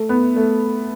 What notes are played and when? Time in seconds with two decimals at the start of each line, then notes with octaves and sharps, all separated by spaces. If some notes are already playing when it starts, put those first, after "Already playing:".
Already playing: A3
0.09 B3
0.36 A3